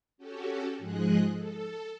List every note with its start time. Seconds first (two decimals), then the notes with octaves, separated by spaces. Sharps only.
0.18 C#4 F#4 G4 A4
0.78 G#2 F3 G#3 G#4 D#5 F#6
1.33 A4